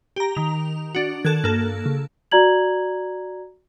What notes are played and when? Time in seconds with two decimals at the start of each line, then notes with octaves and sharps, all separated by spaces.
0.16 G4 A#5
0.35 D#3 F7
0.95 D4 F#4
1.25 D#3 A4 F#6 G#6
1.44 G2 A#3 A4
1.86 C#3
2.32 F#4 D5 A#5 G#6 F#7